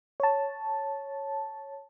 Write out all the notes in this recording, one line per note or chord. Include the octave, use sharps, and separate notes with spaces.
C#5 A5